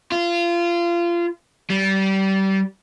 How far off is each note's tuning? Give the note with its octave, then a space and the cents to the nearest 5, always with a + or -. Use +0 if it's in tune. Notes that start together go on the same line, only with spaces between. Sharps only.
F4 -25
G3 -25